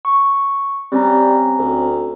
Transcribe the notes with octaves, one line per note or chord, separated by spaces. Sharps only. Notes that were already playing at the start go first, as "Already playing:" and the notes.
C#6
G3 C4 C#4 A#5
D2